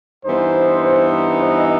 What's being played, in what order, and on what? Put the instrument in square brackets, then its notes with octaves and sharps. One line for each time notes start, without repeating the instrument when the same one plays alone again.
[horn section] G2 E3 B3 D#4 [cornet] C5
[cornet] C5
D#5